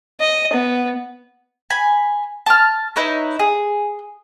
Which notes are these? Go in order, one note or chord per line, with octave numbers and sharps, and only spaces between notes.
D#5
B3
G#5 B5
A5 D6 F6
D#4 E4 B4 C#5
G#4